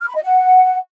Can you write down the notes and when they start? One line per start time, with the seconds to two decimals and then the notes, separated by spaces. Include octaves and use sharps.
0.01 F6
0.08 B5
0.16 D#5
0.23 F#5